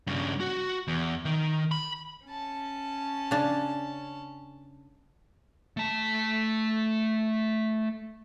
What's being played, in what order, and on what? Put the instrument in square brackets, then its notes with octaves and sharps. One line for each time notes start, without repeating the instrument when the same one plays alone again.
[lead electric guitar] G2 C#3
F#4
E2
D#3
B5
[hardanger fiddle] C#4 A5
[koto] C#3 D4
[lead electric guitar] A3 A5